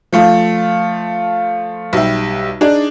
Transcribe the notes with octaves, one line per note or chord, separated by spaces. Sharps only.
F3 A3 F4
B1 G3 G4 E5
D4 D#4 G#4 D5